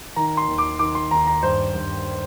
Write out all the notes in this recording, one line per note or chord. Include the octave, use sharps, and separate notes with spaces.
D#3 A#5
C6
D#2
D6
D#3 D6
C6
D#2 A#5
A#5
G2 C5
G2